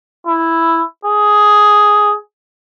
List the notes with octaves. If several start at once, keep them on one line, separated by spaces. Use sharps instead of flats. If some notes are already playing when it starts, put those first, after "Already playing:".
E4
G#4